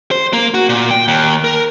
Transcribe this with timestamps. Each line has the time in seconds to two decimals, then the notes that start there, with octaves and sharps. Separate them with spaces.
0.11 C5
0.33 A#3
0.54 F#4
0.69 A#2
0.91 G5
1.08 D#2
1.44 A#4